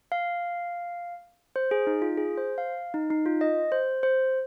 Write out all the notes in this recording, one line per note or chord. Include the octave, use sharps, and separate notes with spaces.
F5
C5
G#4
D#4
F4
G#4
C5
F5
D#4
D#4
F4
D#5
C5
C5